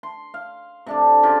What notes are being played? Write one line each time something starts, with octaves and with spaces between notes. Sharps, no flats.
C6
F5
C3 D4 A4
C#3 F4 G4